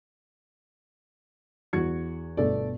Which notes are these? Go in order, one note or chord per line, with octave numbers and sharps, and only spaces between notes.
E2 F#4 G#6 C#7
G1 B2 A3 A4 D5